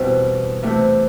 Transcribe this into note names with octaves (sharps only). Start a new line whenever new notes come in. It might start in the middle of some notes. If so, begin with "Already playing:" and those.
Already playing: E2 B2 G3 C4 E4
C3 E3 A3 E4